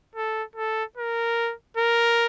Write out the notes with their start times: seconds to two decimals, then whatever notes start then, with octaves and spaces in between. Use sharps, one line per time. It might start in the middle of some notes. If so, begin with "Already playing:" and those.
0.15 A4
0.55 A4
0.97 A#4
1.77 A#4